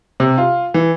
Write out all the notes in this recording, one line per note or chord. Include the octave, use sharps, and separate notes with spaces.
C3
F4
E3